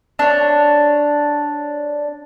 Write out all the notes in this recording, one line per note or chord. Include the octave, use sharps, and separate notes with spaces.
D4 C#5